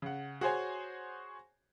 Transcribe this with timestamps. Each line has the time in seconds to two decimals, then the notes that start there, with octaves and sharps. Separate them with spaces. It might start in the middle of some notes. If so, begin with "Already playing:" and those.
0.02 C#3 F#5
0.41 F#4 G#4 C5 C#5 G#5